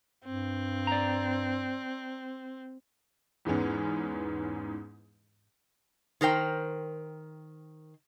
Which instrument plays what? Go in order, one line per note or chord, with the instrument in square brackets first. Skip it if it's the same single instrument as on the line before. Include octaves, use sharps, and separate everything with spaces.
[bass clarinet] G2 [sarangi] C4
[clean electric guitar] D5 A#5
[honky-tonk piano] E2 G#2 G#3 B3 C#4
[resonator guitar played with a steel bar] D#3 A#4 C5 G5